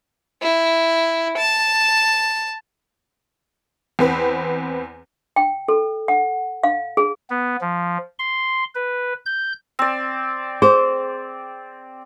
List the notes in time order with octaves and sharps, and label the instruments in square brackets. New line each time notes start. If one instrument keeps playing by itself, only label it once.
[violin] E4
A5
[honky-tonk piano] E2 C4 B4
[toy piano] G5
A4
F#5
F5
G#4
[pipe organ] B3
F3
C6
B4
G6
[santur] C4 D5
[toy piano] G#4 [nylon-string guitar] C5